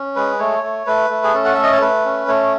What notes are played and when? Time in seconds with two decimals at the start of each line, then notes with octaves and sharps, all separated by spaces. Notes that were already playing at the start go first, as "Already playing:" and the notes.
Already playing: C#4
0.16 G#3 B4
0.39 A3 C#5
0.63 A3
0.86 A3 B4
1.10 A3
1.24 G#4
1.34 C#4 A4
1.45 F#5
1.54 A3 E5
1.63 D#5
1.72 C#5
1.81 A3 B4
2.05 C#4
2.28 A3 C#5